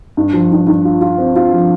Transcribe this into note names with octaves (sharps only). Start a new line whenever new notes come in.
G2
F3
G2
G2
F4
F4
C4
F4
F3